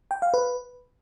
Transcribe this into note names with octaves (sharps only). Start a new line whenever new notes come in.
G5
F5
B4